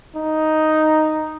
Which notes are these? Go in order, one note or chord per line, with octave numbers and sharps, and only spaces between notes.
D#4